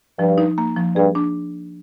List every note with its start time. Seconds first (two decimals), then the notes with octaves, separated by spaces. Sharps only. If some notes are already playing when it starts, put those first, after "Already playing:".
0.19 G2 F3
0.38 D#4
0.58 A#3
0.77 F3
0.96 G2 G#4
1.15 D4